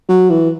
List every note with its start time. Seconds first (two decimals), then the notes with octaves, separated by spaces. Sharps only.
0.09 F#3
0.30 E3